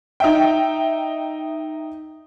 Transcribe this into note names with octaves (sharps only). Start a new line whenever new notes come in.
D#4 E5 G5